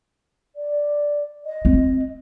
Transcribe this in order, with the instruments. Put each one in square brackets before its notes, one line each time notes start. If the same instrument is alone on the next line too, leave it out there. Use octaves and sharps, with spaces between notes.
[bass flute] D5
D#5
[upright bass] C4